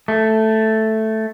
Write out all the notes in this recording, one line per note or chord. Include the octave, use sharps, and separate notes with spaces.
A3